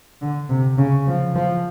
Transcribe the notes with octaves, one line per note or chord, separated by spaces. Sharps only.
D3
C3
C#3
F3
F3